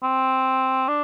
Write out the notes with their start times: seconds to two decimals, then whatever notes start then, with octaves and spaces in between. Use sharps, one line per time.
0.03 C4
0.88 D4